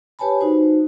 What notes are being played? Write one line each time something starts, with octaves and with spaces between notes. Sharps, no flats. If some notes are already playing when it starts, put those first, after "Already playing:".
G4 B4 C#5 G#5 A5 B5
D#4 F#4 C5